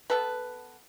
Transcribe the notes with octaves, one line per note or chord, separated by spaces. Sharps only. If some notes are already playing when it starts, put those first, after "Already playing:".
B3 A4 B4